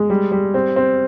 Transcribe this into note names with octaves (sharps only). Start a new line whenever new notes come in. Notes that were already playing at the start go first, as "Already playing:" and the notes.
Already playing: G#3
G3
G3
C4
C4